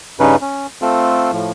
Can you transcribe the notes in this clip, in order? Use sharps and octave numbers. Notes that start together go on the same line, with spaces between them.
G2 C#3 C#4 D#4 B4
C#4
A3 C4 F4 A4
A2 F3